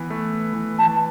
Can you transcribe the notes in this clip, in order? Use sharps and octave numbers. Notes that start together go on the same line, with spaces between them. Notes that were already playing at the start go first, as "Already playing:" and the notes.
Already playing: E3 B3
A3
E3
E3 A5